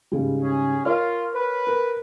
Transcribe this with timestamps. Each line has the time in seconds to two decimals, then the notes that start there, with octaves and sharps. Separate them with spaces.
0.12 G#2 C#3 G3
0.42 C#4 G#4
0.85 F4 A#4 C#5 F6
1.34 B4
1.67 A#4